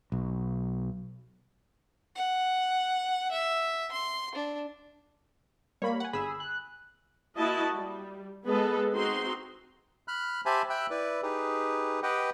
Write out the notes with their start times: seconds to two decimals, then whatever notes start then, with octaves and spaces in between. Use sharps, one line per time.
0.12 B1
2.16 F#5
3.31 E5
3.92 C6
4.35 D4
5.82 G3 A#3 C#5 B5
6.00 F#5 G#5
6.13 G1 G#4 B5 E6
6.40 F#6
7.36 A#3 E4 F#4 D#5 A5
7.73 G3
8.45 G#3 B3 G#4 A4 B4 D#5
8.91 C4 D#4 F#4 G#4 C6
10.08 B5 F6 F#6
10.46 G4 C5 E5 G#5 A5 B5
10.70 E5 G5 B5 E6 F#6
10.90 E4 B4 D5
11.23 D#4 G4 G#4 B4
12.03 G4 B4 D#5 F#5 G5